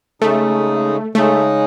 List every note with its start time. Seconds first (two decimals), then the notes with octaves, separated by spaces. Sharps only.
0.22 C#3 G#3 A3 D#4
1.15 C#3 G#3 A3 D#4